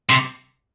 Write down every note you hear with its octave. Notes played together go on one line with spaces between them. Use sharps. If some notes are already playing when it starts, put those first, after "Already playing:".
C3